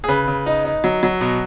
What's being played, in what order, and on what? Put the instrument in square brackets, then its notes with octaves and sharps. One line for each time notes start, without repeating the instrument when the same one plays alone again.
[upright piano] G#4
C#3 B4
C#3
D#4
D#4
F#3
F#3
B2